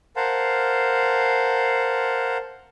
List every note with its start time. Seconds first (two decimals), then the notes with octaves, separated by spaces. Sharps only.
0.16 A#4 C5 F5 F#5 A5